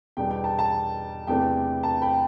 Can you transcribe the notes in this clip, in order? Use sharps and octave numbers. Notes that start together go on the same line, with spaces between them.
E2 B2 G3 D4 G5
G5
A5
A5
E2 C3 E3 A3 D4 G5
A5
G5 B5